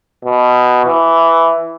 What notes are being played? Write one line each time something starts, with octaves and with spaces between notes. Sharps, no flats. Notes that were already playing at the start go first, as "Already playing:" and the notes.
B2
E3